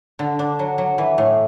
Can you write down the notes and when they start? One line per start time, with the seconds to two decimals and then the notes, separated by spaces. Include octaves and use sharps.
0.19 D3
0.39 D4
0.59 F#3
0.78 F#3
0.98 E3
1.18 A2